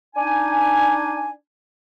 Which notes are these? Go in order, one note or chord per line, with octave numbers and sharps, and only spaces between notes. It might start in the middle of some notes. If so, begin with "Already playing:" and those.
D4 D#4 G#5